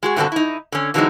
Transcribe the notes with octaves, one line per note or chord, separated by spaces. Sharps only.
G#3 F#4 G#4
G2 B2 D3 C4 F#4 A4
D#4 E4
D3 C#4
D3 E3 F#3 G#3 C4 D#4